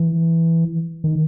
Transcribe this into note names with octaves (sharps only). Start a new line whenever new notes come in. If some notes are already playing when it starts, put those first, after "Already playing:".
Already playing: E3
D#3